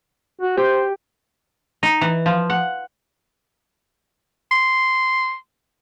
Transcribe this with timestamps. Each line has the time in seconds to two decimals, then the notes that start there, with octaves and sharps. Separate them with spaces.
0.41 F#4
0.57 G4 C5
1.83 D#4
2.01 E3
2.26 F3
2.50 F#5
4.51 C6